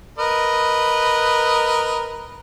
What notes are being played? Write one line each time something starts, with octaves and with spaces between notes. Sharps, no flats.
A#4 B4 D#5